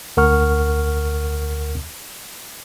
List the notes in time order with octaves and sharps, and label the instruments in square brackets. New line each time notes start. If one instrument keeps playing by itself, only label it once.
[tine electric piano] D2 A#4 F#5 C#6 F6